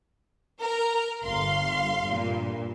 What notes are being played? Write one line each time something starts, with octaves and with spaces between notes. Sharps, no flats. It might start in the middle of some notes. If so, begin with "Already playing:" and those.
A#4
G1 F5 C6
G2 A#2